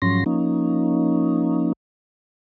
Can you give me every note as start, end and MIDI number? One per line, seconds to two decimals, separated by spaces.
0.02 0.24 44
0.02 0.24 53
0.02 0.24 54
0.02 0.24 61
0.02 0.24 84
0.02 0.24 94
0.26 1.73 53
0.26 1.73 58
0.26 1.73 61
0.26 1.73 63